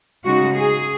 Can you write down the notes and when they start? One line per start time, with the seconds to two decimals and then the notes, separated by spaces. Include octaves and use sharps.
0.25 C#3 G#3 D#4 F#4
0.55 G#4